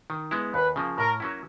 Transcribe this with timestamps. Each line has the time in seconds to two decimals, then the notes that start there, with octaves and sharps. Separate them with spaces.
0.10 D#3
0.31 G#3 B3 E4
0.54 D#2 B4
0.76 C#3 F3 A#3
0.97 A2 A#4
1.20 F#3 A#3 C#4 E4